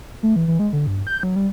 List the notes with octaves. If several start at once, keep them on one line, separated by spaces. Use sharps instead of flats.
A3
E3
E3
G#3
D3
G2
G6
F#3
G3